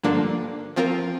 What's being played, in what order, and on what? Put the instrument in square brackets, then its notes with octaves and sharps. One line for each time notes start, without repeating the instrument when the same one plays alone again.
[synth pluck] G2 D3 F3 A#3 D4
F3 C4 F4 A#4